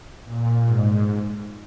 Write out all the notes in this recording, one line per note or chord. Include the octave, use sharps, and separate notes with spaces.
A#2
G#2